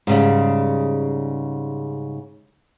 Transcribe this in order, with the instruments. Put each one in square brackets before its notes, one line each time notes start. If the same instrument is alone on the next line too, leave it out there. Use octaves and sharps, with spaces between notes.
[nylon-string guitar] G#2 C#3 G3